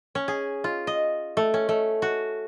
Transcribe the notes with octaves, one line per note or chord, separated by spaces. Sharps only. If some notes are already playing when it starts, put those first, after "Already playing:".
C#4
G#4
F4
D#5
A3
C#4
A3
F#4